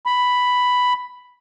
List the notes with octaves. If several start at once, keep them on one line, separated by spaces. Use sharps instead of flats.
B5